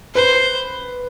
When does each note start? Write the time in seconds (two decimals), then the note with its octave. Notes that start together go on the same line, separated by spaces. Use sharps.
0.15 B4 C5